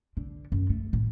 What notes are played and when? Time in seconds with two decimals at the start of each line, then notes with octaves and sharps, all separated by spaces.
0.17 D3
0.52 F#2
0.70 A3
0.93 A2